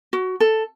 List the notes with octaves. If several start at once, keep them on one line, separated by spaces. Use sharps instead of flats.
F#4
A4